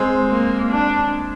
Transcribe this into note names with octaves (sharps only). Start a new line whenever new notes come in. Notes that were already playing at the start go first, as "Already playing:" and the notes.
Already playing: G#3 C4
A#3
D4